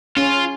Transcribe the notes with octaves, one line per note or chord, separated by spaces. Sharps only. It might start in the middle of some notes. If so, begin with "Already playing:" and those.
C#4 F4